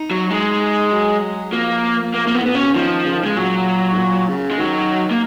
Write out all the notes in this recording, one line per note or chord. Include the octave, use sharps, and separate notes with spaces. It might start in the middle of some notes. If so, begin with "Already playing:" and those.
Already playing: D#4
F#3
G#3 D#4
F#3
F3 A#3
A#3
A#3
B3
G#2
B3
A#2
B2 C#4
C#3
D#3 F3
C#3
D#3
C#3 G#3
A#2 F#3
G#2
A#2
C#3
G#3
D#3 F#3
A#3